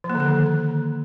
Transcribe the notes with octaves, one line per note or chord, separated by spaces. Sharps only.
F3
A#3
D3
A#3
D#3